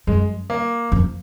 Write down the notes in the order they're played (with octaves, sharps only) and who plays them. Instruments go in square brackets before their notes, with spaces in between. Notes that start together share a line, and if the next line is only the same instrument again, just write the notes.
[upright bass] F#2 [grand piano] G#3
[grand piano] A#3
[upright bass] F2